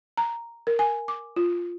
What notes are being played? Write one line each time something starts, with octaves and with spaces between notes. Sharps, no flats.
A#5
A#4
G#5
D6
F4